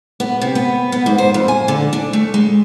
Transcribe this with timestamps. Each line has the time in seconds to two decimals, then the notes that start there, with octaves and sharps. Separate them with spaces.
0.20 B3
0.41 C3
0.55 B3
0.92 B3
1.06 G#2
1.18 C5
1.34 F2
1.48 G#5
1.68 D3
1.93 D4
2.13 A3
2.34 G#3